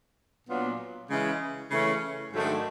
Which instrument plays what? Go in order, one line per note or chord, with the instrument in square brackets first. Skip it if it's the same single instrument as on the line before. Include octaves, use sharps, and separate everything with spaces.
[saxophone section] A#2 F#3 B3 D4 F4
C#3 E3 G#3 C#4
C#3 E3 A3 C#4
G#2 D#3 F#3 A3 D4